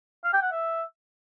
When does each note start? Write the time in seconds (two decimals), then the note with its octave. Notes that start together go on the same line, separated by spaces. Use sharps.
0.24 F5
0.33 G5
0.42 F#5
0.51 E5